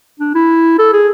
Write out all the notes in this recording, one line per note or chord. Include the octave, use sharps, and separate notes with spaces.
D4
E4
A4
G#4